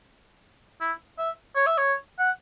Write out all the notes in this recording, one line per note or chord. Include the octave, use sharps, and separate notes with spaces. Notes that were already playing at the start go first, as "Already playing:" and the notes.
E4
E5
C#5
E5
C#5
F#5